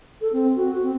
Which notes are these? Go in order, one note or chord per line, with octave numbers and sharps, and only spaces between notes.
A4
C4
F#4
C4